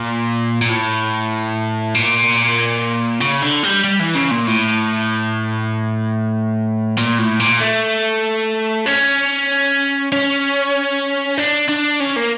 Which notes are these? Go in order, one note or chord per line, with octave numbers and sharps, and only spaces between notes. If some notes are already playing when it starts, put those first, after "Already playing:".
Already playing: A#2
A#2
A2
A#2
C#3
D3
G3
G3
E3
C#3
A#2
A2
A#2
A2
A#2
A3
C#4
C#4
D4
D4
C#4
A#3